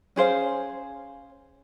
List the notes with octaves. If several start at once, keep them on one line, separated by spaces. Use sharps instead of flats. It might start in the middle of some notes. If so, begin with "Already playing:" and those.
C#4 G#4 C5 F5